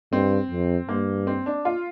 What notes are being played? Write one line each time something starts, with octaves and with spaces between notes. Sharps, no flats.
G2 C4
F2
G2 A#3
C4
D4
F4